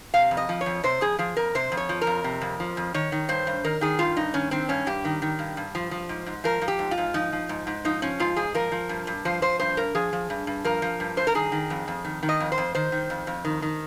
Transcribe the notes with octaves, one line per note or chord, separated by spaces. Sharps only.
C3 F5
F2
D#5
F3
C#5
F2
C3 C5
F2 G#4
F3 G#4
F2 A#4
C3 C5
F2
C#5
F3
A#4
F2
C3
F2
F3
F2
D#3 C#5
D#3
G2 C5
G2
D#3 A#4
D#3 G#4
G2 F4
G2 D#4
D#3 C#4
D#3 C4
G2 C#4
G2 G4
D#3
D#3
G2
G2
F3
F3
G#2
G#2
F3 A#4
F3
G4
G#2
F4
G#2
F3 D#4
F3
G#2
G#2
F3 D#4
F3 C#4
G#2 F4
G#2 G#4
F3 A#4
F3
G2
G2
F3 C5
F3 C5
G2 C5
G2 A#4
F3 G#4
F3
G2
G2
F3 A#4
F3
G2
G2 C5
A#4
D#3 G#4
D#3
F2
F2
D#3
D#3
D#5
F2
C5
F2
D#3 C5
D#3
F2
F2
D#3
D#3